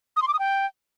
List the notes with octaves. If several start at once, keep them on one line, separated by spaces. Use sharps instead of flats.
D#6
C6
D6
D#6
G5